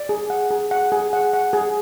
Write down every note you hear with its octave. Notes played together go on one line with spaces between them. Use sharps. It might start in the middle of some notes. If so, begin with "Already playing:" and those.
Already playing: D5
G#4
F#5
G#4
F#5
G#4
F#5
F#5
G#4